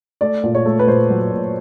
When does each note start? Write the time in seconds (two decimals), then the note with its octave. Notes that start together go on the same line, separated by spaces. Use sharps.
0.21 A3 D5
0.44 A#2
0.55 C#5
0.66 A3
0.79 B4
0.87 A#2 C5
1.10 F#3
1.21 B4
1.31 A#2